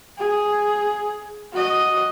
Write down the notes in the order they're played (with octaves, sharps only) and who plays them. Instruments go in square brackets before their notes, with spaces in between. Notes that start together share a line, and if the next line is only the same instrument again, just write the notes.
[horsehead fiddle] G#4
F#4 D#5